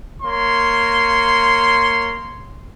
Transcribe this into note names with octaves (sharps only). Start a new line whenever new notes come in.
A#3 C#5 C6